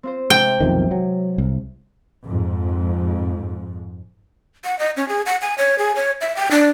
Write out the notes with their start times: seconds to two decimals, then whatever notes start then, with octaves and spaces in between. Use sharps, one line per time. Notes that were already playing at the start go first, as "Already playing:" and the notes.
0.03 C4 F4 C5
0.30 C3 G#3 E4 G5
0.60 B1 F2 D#3
0.91 F#3
1.38 C2
2.23 F2 G#2
4.64 F#5
4.79 D#5
4.97 C#4
5.09 G#4
5.26 F#5
5.42 G#5
5.58 C#5
5.79 G#4
5.96 C#5
6.21 E5
6.36 G5
6.51 D4